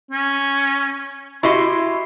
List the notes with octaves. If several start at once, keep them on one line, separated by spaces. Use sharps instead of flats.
C#4
E4 F#4 G4 D#5 C6